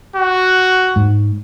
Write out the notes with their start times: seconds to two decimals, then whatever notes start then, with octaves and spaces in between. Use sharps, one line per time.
0.16 F#4
0.96 G#2